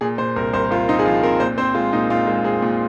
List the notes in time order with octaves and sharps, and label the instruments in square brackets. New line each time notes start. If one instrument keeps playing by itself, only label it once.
[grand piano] A#2 G#4
A#2 C5
C2 A#4
C2 C5
C2 F4
C4 D#4
G#4
F3 F4
C4 A#4
A#2 C5
C4 C5
G#3 F4
A#2 D#4
A#2 F4
G#3
C4 G#4
A#2